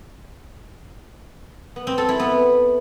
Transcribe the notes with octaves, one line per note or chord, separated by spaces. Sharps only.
B3
C4
A4
E4
B3